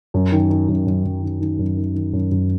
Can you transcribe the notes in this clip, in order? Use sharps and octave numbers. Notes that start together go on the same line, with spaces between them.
F#2
D#3
D#3
F#2
F#2
F#2
D#3
D#3
F#2
D#3
D#3
F#2
F#2